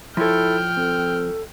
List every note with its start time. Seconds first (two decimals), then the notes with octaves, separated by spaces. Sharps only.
0.17 F3 E4 A4 C#5 G5 F6
0.77 C4 A4